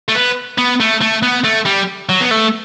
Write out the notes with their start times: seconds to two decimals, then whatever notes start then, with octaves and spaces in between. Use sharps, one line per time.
0.09 A3
0.15 B3
0.58 B3
0.80 A3
1.01 A3
1.23 B3
1.44 A3
1.66 G3
2.09 F#3
2.21 B3
2.31 A3